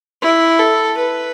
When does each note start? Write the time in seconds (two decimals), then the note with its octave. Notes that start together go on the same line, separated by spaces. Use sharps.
0.22 E4
0.59 A4
0.97 B4